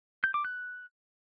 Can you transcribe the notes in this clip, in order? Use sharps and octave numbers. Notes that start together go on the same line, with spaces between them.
G6
D6
F#6